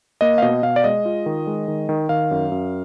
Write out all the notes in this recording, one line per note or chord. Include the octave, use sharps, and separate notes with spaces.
A#3 D#5
F5
B2 D#5
B2 F5
D5
G#3 D#5
F4
D#3
G#3
D#3
D#3
D#3 F5
F#2
F#2